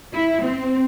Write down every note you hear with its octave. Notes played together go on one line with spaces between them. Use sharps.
E4
C4